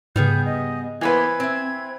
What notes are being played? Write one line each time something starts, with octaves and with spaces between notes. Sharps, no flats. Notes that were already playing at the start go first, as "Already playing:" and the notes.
G#2 C#3 G3 B3 G#4 G6
D#5
E3 A#3 B3 B4 C5 G#6
C4 E5